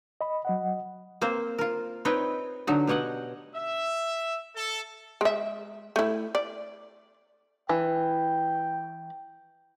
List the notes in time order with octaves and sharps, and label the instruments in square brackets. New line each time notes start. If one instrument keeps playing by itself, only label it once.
[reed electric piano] D#5 B5
F#3 D#5 F#5
[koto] A#3 C4 C5
F4 A#4
C4 D#4 B4 C#5 D#5 G5
D3 F#3 D#4
B2 G4 C#5 D#5 F#5
[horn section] E5
A4
[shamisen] G#3 E5
A3 E4
D5
[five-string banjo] E3 [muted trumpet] G5